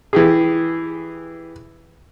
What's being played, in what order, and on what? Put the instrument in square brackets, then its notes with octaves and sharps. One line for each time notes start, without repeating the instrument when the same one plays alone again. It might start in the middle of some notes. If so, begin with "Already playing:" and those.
[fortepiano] E3 G4 G#4